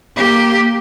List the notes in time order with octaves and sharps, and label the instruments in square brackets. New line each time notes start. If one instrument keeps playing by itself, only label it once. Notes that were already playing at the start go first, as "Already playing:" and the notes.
[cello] A#3 G4